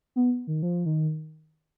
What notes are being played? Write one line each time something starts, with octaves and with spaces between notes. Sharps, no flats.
B3
D#3
F3
D#3